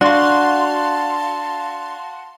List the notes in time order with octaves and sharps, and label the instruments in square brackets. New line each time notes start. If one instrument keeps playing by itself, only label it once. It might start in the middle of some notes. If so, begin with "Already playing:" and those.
[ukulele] D4 [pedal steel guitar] F#4 [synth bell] F5 C6 [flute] A5